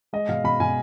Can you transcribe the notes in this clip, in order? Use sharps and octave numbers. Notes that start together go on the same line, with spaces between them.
G#3 D#5
B2 F5
B2 B5
B2 G#5